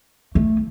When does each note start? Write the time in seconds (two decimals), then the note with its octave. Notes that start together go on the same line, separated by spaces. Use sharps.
0.35 A3